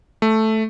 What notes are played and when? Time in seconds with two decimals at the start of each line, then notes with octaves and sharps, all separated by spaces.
0.22 A3